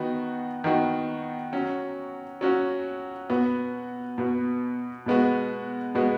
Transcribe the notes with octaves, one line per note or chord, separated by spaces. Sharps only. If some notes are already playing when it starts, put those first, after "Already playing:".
Already playing: D#3 B3 D#4 F#4
D#3 B3 D#4 F#4
F#3 C#4 F#4
F#3 C#4 F#4
B2 B3 F#4
B2 B3 F#4
B2 G#3 B3 F#4
B2 G#3 B3 F#4